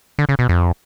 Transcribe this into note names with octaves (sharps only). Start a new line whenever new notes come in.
D3
C#3
B2
F2